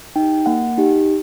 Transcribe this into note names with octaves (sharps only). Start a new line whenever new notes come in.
D#4 G4 G5
A#3 F#5
D#4 G4